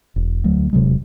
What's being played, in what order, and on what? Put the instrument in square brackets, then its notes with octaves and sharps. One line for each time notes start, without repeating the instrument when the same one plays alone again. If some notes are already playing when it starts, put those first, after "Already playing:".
[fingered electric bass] E1
D2 F#3 A3
E1 C3 F#3 G#3